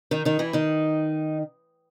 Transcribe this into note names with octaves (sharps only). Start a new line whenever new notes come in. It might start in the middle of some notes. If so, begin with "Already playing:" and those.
D#3 D#4
D#3 D#4
E3 E4
D#3 D#4